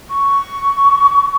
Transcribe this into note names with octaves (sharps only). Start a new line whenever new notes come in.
C#6